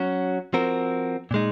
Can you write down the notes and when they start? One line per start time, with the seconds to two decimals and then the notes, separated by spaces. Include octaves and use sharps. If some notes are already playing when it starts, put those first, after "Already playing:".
Already playing: F#3 C#4 F#4
0.53 F3 C4 F#4 A#4
1.31 A#2 G#3 D#4